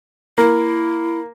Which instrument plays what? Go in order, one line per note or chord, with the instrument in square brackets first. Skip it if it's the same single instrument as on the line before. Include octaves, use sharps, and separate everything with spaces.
[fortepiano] A#3 [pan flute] E4